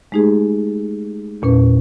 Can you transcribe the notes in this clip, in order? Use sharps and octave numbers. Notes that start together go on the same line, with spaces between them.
G#3 A3 D#4 G4 G#4
E2 A#2 C#4 B4